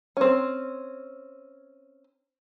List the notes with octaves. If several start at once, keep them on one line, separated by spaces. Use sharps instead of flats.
C4 C#4